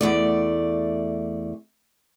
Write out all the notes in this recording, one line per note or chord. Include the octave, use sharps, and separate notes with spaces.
E2 A3 D5